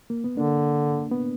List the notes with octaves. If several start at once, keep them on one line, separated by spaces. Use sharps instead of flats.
A#3
B3
D3 A#3 D4
B3